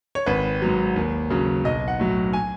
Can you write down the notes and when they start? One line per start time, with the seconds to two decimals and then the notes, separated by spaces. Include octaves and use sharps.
0.15 C#5
0.26 G#1 B4
0.62 G#2 F#3
0.96 D#2
1.30 C#3 F#3
1.64 B1 D#5
1.88 F#5
2.00 A2 F#3
2.33 G#5